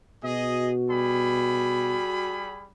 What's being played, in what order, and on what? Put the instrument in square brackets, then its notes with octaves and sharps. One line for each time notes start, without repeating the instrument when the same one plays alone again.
[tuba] B2 [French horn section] F#4 [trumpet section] G#4 D#5
[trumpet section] G3 G#4 B5